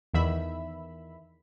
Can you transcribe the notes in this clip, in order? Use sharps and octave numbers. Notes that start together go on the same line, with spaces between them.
E2 D#3 E5 B5